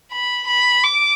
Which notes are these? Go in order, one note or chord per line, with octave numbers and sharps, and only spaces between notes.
B5
B5
D6